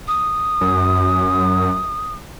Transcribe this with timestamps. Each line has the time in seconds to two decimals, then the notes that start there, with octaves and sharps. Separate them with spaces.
0.08 D#6
0.61 F#2